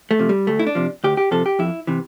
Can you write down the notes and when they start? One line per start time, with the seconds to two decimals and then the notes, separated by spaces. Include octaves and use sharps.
0.11 A3
0.19 C3 F3
0.29 G3
0.47 D2 A3
0.59 E4
0.67 D4
0.75 C3 F3
1.04 D2 G4
1.17 G4
1.31 C3 F3 A4
1.46 G4
1.59 F2 E4
1.87 C3 E3